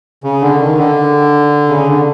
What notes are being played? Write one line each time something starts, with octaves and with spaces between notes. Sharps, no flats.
C#3
D3
D#3
D3
C#3
D3